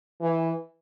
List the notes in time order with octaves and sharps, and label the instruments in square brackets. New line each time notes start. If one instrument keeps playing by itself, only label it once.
[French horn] E3